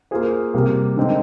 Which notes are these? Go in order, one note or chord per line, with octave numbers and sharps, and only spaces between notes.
A#3 F4 G#4 C5
C3 G3 A#3
D3 G#3 C4 D#4